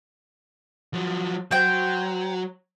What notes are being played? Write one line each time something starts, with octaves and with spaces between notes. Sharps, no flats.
F3 F#3
F#3 C5 G5